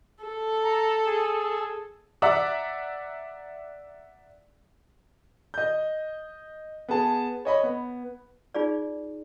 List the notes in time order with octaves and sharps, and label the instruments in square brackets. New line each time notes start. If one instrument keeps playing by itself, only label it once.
[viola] A4
[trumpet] A#5
G#4
[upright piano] D5 E5 F#5 A#5 D6
D#5 G6
B3 G#4 A5
C#5 D#5 B5
B3
[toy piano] D#4 F4 G#4 D5